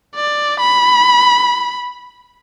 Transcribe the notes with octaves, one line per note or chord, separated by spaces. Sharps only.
D5
B5